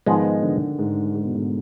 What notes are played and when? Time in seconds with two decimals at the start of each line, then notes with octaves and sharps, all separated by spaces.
0.06 G#2 D#3 F3 G#3 B3 D#4
0.43 D3
0.79 G#2
1.15 G#2
1.25 B2
1.35 G#2